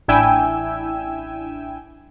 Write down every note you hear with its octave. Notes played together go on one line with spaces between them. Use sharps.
A1 D4 E4 G5 G#5 E6